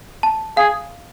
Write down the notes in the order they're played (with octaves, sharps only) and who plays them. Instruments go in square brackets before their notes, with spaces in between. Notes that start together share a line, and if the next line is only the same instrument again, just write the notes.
[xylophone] A5
[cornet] G#4 [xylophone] F5